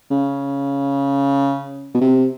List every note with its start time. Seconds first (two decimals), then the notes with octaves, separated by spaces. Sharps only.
0.11 C#3
1.94 B2
2.01 C3